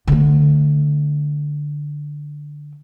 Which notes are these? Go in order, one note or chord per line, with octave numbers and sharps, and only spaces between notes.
D3 A3